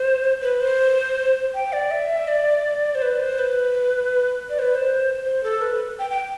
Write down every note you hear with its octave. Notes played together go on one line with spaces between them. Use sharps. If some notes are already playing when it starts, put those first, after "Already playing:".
Already playing: C5
B4
C5
G5
D5
E5
D5
C5
B4
C5
B4
D5
C5
B4
C5
C5
A4
B4
G5
G5